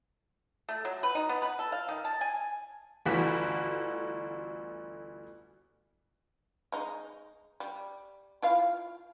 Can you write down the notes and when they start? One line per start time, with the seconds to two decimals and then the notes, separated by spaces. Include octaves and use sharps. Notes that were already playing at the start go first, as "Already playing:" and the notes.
0.69 A3
0.85 F#3
1.03 B4
1.15 D#4
1.29 B3
1.42 B4
1.59 A4
1.72 F5
1.89 D#3
2.05 A5
2.21 G#5
3.05 G1 D2 E3 F#4 B6
6.72 G#3 D#4
7.60 G3
8.42 E4 F4 F5